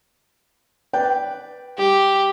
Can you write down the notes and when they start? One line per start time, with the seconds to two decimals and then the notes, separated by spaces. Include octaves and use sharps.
0.93 B4 D5 G5
1.78 G3 G4